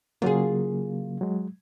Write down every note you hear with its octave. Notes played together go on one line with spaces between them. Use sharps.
C#3 F#3 A#3 F4 G#4
F#3 G#3